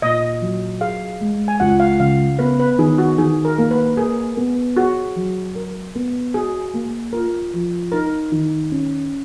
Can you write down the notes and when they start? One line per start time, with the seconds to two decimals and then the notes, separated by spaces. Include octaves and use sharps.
0.02 A#2 D#5
0.41 F#3
0.81 G#4 F5
1.21 G#3
1.48 G#5
1.60 C#2 F#5
1.80 F5
2.00 C#3 F5
2.39 B3 B4
2.59 B4
2.78 D#3 G#4
2.98 F#4
3.18 D#3 G#4
3.45 A#4
3.58 A#3
3.71 B4
3.97 G#4 A#4
4.37 B3
4.77 F#4 G#4
5.16 F#3
5.55 A#4
5.95 B3
6.34 F#4 G#4
6.74 A#3
7.13 F4 A#4
7.53 F3
7.92 D#4 A#4
8.32 D#3
8.71 C#4